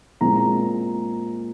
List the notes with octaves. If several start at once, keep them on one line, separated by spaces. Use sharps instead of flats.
A#2 G#3 C4 A#5